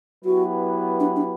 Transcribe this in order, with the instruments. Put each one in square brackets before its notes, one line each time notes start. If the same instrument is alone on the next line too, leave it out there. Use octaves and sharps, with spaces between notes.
[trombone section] F#3 B3 E4 G4 B4 [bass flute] F#4
[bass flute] D4
D4